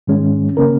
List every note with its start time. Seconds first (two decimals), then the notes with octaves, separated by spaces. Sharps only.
0.07 G#2 D#3 G#3 C#4
0.57 C#3 A#3 C#4 A#4